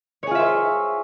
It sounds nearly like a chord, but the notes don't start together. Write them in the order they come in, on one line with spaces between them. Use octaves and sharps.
C#5 G#4 F4 E5 C5